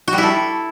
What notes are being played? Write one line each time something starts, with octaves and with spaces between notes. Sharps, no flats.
F#4
G3
E4
A4